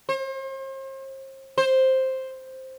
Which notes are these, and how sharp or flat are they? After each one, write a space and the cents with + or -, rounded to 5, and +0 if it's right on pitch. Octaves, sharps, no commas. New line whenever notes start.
C5 +40
C5 +5